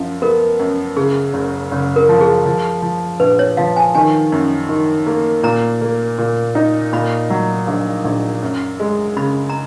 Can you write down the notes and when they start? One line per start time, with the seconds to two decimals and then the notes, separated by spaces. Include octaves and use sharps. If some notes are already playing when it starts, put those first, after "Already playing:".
Already playing: F#2 F3
0.22 B3 A#4
0.59 F#2
0.96 C#3 G#4
1.33 F#1
1.71 F#1
1.96 A#4
2.09 F3
2.21 G#4
2.46 F3
2.82 F3
3.20 A#1 B4
3.39 C#5
3.57 F3 F5
3.76 G#5
3.95 D#3 G#5
4.32 F#2
4.69 D#3
5.07 A#3
5.43 A#2 A#5
5.81 A#3
6.18 A#2
6.55 D#4
6.93 A#2 B5
7.30 F#3
7.67 A#1
8.04 A#1
8.42 F#2
8.80 G#3
9.16 C#3 B5
9.50 A#5